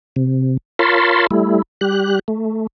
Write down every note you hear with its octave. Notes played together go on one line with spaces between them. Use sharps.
C3
F4 A#4 C#5 A5 B5 C6
G3 A3 E4
G3 G4 F#6
A3